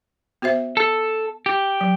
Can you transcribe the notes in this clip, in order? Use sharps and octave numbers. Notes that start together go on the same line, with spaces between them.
B3 F#4 C5 E5
A4
G4
F#3